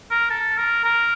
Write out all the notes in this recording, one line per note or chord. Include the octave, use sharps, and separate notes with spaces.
A#4
A4
A#4
A#4